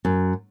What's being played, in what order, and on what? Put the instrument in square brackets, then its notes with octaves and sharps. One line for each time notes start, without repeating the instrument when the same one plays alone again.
[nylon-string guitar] F#2